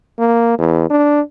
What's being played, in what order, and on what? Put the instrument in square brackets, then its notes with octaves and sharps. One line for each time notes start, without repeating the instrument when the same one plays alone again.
[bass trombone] A#3
E2
D4